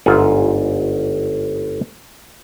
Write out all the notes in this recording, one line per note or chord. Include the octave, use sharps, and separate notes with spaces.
G1 G#2 F4 E5 F#5 G#5